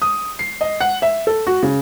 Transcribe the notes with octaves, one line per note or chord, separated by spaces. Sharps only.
D#6
C7
D#5
F#5
E5
A4
F#4
C#3